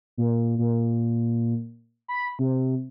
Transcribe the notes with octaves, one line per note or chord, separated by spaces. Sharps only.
A#2
A#2
B5
C3